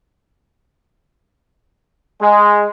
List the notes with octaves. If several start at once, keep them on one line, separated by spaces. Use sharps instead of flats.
G#3